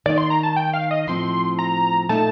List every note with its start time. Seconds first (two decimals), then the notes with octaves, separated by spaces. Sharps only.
0.06 D#3 A#3 D#4 D5
0.18 C6
0.30 A#5
0.43 A5
0.56 G5
0.73 F5
0.91 D#5
1.07 A2 F3 C4 C6
1.59 A#5
2.09 A#2 A3 D#4 A5